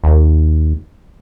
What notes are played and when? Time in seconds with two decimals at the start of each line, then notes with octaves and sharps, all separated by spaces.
0.04 D#2